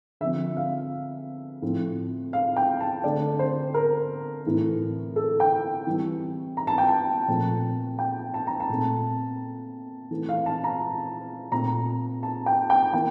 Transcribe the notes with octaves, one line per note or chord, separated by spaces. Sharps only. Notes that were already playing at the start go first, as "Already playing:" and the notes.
D3 F3 C4 E5
F5
A2 F3 C4
F5
G5
A5
D3 A3 C4 D5
C5
A#4
A2 E3 A3 C4
A4
G5
E3 G3 C4
A#5
A5
G5
A5
A#2 F3 A3 C4
G5
A5
A#5
A5
A#2 A3 C4
E3 A3 C4
F5
A5
A#5
A#2 A3 C4 A#5
A5
G5
G5
E3 A#3 G5